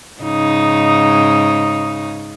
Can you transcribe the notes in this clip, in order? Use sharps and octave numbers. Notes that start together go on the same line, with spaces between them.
G#2 C#3 D#4